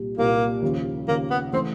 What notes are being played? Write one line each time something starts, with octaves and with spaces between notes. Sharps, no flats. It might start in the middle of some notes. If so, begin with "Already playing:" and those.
Already playing: C2 A#2 G3
C2 A#2 G3 A#3
D#2 C#3 F3
D#2 C#3 F3 A#3
B3
C#3 E3 A3 C4